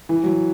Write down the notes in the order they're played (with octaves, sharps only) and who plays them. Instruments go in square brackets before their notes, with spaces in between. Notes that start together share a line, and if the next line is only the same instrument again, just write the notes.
[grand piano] E3
F#3